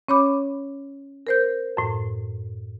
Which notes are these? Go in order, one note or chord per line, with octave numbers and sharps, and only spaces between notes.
C#4 C#5 B5 D6
A#4 C5 G6
F#2 A2